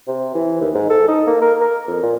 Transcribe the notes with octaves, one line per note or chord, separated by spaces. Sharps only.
C3
E3
D#2
G#2
A4
D#4
A#3
A#4
A#4
F2
A#2